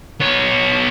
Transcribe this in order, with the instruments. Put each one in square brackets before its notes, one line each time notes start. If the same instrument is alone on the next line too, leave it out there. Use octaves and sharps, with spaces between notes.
[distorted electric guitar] B3 C#5